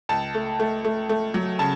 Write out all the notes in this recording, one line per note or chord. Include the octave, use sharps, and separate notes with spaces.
C#2 A5
A3
A3
A3
A3
F#3
C#3 A5